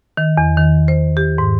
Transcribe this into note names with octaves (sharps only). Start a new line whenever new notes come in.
D#3
E2
D#3
C5
G4
G#2